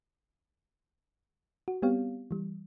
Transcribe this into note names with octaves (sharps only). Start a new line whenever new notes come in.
F#4
G3 B3 C4 G4 C#5 F5
E3 G3